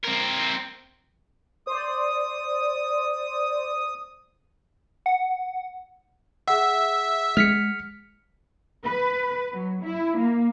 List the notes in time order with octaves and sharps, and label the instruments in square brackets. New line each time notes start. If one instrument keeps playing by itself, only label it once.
[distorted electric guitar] C4 A#4
[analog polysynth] C5 D5 [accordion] D#6
[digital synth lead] F#5
[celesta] G#4 F#5 [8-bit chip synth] E5
[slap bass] G#3 [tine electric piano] F6 B6 C#7
[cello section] B4
F#3
E4
A#3